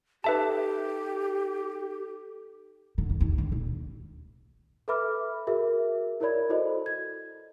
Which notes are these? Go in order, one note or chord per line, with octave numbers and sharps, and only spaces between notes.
D#4 G4 A4 B4 E5 A5
D3
F2
D#2
D3
D#1
A4 B4 E5 B5 D6 F6
F#4 G#4 A#4 E5
E4 A#4 C#5 D5 B5 G#6
E4 F#4 A4 C5 D#5
G#6